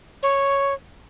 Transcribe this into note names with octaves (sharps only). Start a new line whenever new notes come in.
C#5